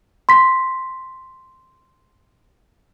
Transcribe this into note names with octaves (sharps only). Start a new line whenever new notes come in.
C6 B6